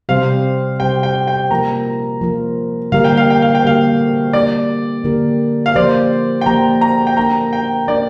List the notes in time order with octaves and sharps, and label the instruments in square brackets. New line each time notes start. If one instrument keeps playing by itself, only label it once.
[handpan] C3 G3 C4 G4 C5 [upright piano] F5
[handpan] C3 G3 C4 G4 C5 [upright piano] G5
[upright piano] G5
G5
[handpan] F3 A#3 F4 A#4 [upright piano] A#5
[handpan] F3 A#3 F4 A#4
[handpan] D3 G3 A#3 G4 A#4 [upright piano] F5
[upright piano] G5
F5
G5
F5
G5
[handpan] D3 G3 A#3 G4 A#4 [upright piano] F5
[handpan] D3 A#3 D4 G4 A#4 [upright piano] D5
[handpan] D3 A#3 D4 G4 A#4
[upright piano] F5
[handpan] F3 A#3 G4 C5 [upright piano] D5
[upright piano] G5
[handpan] F3 A#3 G4 C5 [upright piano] A#5
[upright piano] A#5
G5
[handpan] A#3 D4 A#4 [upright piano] A#5
[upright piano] G5
[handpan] A#3 D4 A#4 [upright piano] D5